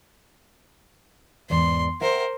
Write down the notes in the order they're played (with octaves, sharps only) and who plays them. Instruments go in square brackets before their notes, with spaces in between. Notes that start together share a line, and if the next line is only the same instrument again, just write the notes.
[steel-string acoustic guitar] E2 G#2 D5 [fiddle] C6
[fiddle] A#4 C5 [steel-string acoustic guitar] E5 F#5 G5